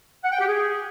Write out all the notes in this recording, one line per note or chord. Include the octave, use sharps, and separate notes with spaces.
F#5
G5
G4
G#4